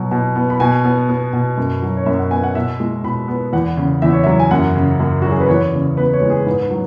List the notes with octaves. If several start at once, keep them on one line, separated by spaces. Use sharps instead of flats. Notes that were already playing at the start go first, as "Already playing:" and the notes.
Already playing: B2 F#3
B2
B3
B5
B2 G#5
B3
B3
B2
F#2
F#3
C#5
F#2 E5
F#5
B3 G#5
F#5
B2 E5
G#3
B2 B5
B3
E2 F#5
C#3
E2 E5
C#5
F#3 E5
G#5
F#2 F#5
C#3
F#2
F#3 F#4
G#4
B4
E2 C#5
C#3
B3 B4
C#5
G#3
G#4
G#2 B4
B4
F#3